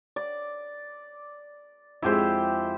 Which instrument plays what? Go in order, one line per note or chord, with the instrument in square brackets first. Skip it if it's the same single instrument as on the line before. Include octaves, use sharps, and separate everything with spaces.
[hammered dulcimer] D5
[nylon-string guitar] F2 G#3 [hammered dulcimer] E4 G4 C5